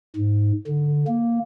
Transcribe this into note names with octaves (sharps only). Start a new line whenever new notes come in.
G#2
D3
A#3